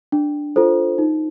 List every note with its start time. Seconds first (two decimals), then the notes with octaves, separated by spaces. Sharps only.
0.12 D4
0.56 F4 A4 C5
0.98 D#4